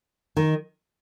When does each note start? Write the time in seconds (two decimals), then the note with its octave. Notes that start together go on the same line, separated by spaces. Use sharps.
0.37 D#3 D#4